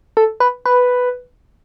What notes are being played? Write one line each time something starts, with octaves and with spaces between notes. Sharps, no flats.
A4
B4
B4